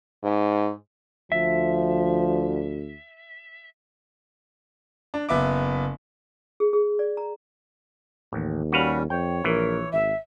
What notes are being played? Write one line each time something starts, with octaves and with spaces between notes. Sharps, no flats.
G#2
D2 F3 E5
D4
F#1 B3 E5 D6
G#4
G#4
D5
A#5
A1 D#2
G3 C#4 F#4 B4 F5
F2 C#5 G5
A#1 E3 A#4
G#1 E5